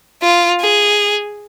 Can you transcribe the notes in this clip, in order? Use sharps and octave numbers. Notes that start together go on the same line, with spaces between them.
F4
G#4